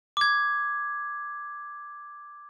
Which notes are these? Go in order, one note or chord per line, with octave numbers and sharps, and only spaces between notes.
D6 G#6